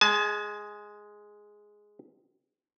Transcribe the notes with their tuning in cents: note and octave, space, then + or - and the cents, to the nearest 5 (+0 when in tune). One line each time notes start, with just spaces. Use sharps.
G#3 +0 A5 -45